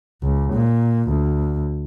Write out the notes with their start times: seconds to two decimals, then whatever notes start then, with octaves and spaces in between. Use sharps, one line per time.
0.23 C#2
0.53 A#2
1.08 D2